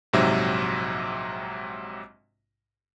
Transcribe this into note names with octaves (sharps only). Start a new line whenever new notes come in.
A#1 G#2 C3 F#3 E5